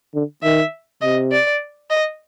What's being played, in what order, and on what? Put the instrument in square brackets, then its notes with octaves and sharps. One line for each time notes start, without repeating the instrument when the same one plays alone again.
[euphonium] D3
[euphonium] D#3 [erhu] E5
[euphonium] C3 [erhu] D#5
[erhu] D5
D#5